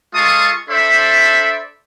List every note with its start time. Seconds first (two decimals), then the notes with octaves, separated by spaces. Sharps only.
0.14 G#3 F4 A4 A5 C#6 D#6
0.69 D4 A4 C5 D5 E5 B5